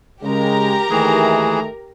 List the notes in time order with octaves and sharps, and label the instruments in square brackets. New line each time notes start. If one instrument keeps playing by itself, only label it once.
[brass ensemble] C#3 G#3 [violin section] G4 A#4 A#5
[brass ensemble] D#2 D#3 A3 [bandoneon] E3 G#4